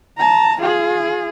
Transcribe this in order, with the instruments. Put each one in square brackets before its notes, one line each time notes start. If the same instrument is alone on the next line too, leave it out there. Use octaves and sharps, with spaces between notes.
[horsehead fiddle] A5 A#5
F4 G#4